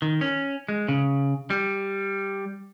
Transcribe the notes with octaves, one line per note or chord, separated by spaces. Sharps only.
D#3
C#4
G#3
C#3
G3